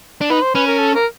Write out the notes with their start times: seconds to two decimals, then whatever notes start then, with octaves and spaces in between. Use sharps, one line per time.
0.21 D4
0.30 D#4 B4
0.42 C5
0.55 C#4 B4
0.67 A#4
0.79 A4
0.95 A#4